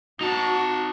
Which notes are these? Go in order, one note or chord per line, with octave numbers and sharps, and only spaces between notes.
D#4 F#4 A5